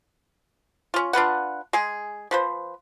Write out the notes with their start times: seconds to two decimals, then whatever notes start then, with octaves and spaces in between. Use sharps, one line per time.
0.94 C#4 F4
1.13 D4 F4 B4 F#5
1.73 G#3 G#4
2.31 F3 B4 C5